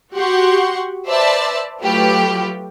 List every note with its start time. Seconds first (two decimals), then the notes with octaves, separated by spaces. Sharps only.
0.15 F#4 G4 F#5 C6 C#6
1.07 B4 C5 D5 E5 A5
1.83 F#3 A3 F4 G4 B4